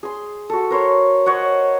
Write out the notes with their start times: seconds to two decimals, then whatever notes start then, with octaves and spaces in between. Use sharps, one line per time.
0.03 G#4 C6
0.50 F#4 A4
0.70 A#4 C5 C#5
1.26 C5 C#5 D#5 F#5